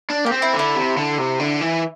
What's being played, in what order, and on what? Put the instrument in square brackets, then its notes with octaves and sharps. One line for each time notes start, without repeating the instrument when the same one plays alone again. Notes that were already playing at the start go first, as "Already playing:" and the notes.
[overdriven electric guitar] D4
[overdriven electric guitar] A#3 [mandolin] G4
[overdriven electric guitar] C4
[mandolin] E4
[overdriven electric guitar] D3
[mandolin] E4
[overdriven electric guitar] C3
D3
C3
D3
E3